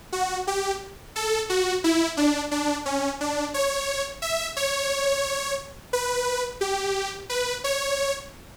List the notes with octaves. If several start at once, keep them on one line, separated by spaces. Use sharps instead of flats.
F#4
G4
A4
F#4
E4
D4
D4
C#4
D4
C#5
E5
C#5
B4
G4
B4
C#5